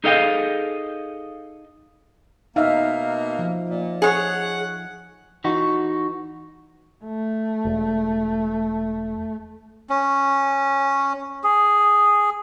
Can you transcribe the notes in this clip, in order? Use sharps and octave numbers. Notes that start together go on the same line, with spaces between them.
D#4 G#4 A4 D#5 F5 G5
B2 A#3 D#4 E5 F5
F3
A#2
G#4 C#5 F#5
E3 D#4 F#4
A3
E1
C#4
G#4